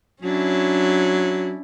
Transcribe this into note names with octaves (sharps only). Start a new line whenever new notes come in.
F#3 C#4 D4 E4